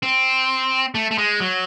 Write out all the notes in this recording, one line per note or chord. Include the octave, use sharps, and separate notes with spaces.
C4
A3
A3
G#3
F#3